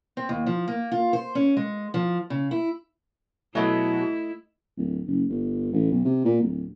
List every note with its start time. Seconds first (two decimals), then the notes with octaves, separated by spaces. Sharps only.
0.17 C4
0.29 D#2
0.47 F3
0.68 A#3
0.92 F4
1.13 C5
1.35 C#4
1.57 G#3
1.94 F3
2.30 C#3
2.51 E4
3.55 B2 F#3 A3 E4 D#5 E5
4.77 D1
5.07 F#1
5.30 G1
5.72 A1
5.91 B1
6.05 C3
6.25 A#2
6.41 D1